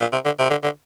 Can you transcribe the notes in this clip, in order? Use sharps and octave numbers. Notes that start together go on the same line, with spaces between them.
A#2
C3
D3
C3
D3
D3